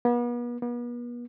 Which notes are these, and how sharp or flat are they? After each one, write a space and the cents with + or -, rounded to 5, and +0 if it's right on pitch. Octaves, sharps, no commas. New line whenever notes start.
B3 -40
B3 -40